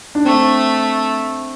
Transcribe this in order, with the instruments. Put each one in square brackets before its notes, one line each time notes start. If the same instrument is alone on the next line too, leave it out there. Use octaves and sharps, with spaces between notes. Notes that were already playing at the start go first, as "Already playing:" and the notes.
[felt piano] D4
[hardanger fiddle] A3 [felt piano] C4